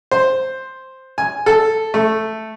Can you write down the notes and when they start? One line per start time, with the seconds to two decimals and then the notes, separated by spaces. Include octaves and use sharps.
0.11 C5
1.18 G#5
1.46 A4
1.94 A3